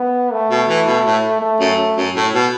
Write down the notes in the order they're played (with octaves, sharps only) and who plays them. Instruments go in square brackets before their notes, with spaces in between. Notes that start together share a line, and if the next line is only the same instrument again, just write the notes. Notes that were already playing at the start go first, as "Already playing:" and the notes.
Already playing: [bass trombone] B3
A3
[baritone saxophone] B2
E3
B2
A2
[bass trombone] A3
[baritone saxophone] F#2
F#2
A2
B2